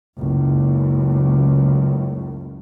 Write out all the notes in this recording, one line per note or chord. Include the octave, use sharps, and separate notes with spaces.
F#1 C#2